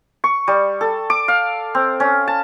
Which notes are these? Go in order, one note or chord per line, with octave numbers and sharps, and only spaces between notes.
C#6
G3
A4
D6
F5
C4
C#4
A5